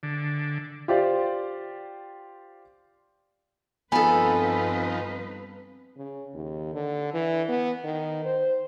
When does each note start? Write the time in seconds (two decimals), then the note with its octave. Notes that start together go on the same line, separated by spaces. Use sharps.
0.03 D3
0.88 F4 G4 C5 D5
3.92 G2 F3 B3 C4 D#4 A4 B4 G#5
5.98 C#3
6.34 D#2
6.74 D3
7.14 E3
7.49 B3
7.84 D#3
8.25 C5